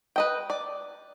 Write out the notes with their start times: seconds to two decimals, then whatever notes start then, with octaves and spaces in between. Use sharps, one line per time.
0.16 B4 D#5 G5
0.50 D5